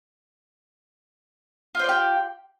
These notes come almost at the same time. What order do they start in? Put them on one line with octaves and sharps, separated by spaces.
F4 C5 D5 G4